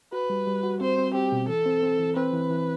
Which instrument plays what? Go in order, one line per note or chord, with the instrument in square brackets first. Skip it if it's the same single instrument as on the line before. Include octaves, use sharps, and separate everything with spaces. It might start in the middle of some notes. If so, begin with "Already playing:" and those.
[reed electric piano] F#4 [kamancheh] B4
[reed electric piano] G3
G3
F#4
[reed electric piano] C4 [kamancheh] C5
[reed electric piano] C4
[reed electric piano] C4 [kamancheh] G4
[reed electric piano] B2
[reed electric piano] E3 [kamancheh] A4
[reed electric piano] C4
C4
E3
[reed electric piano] C4 [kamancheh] B4
[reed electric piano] E3
E3